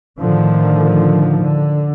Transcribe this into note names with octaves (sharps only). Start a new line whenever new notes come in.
A2 D3 D#3 F3
D3